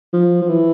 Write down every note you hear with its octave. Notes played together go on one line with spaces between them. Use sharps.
F3
F3
E3